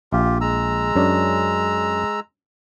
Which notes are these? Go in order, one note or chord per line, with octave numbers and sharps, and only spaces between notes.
A#1 F4 G4 E5
G#3 A#5 E6
F#2 C#4 D4